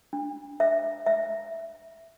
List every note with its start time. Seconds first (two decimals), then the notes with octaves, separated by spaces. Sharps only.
0.13 D4
0.60 E5
1.06 E5